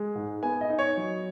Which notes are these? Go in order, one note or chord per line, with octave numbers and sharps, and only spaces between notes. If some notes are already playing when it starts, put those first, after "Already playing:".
Already playing: G#3
G#2
B3 G#5
D#5
D#4
C#5
F#3